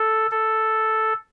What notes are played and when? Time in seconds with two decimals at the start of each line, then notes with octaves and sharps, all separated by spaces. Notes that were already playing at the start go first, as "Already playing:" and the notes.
Already playing: A4
0.31 A4